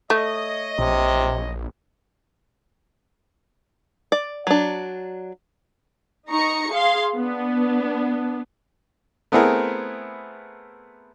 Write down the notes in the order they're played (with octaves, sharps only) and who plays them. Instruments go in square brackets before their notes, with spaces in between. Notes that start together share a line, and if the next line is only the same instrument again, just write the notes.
[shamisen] A3 [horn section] C#5 D#5
[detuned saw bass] A#1 [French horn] C3
[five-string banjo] D5
F#3 D4
[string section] D#4 A#5 C#6 C#7
G#4 F5 C6
B3 D4
[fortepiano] A3 B3 C4 E4 G#4 A#4